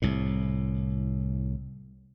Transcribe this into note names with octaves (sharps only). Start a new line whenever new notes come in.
C2 A2